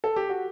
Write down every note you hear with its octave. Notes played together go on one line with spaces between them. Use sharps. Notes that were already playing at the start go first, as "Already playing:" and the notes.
A4
G4
F#4